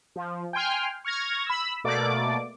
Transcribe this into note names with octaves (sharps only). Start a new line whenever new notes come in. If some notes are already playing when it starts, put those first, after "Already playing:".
F3
G5 G#5 C6 F6
C#6 F6 G#6 A#6
B5 E6
B2 A3 A#3 D5 D6